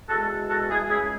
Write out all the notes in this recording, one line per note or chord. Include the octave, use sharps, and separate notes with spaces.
E2 B2 G#3 F#4 A4
F#4 A4
E4 G#4
C#2 C#3 G#3 E4 G#4